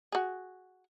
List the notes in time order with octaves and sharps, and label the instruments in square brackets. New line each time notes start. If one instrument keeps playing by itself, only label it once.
[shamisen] F#4 G#4